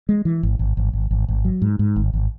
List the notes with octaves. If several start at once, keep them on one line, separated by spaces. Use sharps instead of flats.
G#3
E3
G#1
G#1
G#1
G#1
G#1
G#1
F#3
G#2
G#2
G#1
G#1